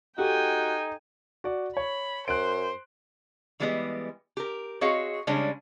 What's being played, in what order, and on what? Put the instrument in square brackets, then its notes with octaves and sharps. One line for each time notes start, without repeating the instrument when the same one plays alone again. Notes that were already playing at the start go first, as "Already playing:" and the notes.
[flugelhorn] D#4 [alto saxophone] F#4 [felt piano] G4 A4 [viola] G5 G#5
[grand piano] F#4 D5
[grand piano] C#5 [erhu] B5
[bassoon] F#2 [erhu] C5 [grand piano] F#6 D7
[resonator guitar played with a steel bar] E3 G3 G#3 B3 G4 D#5
G4 A#4
C4 F#4 G#4 C#5 D#5 F5
C#3 G3 G#3 C#4 D4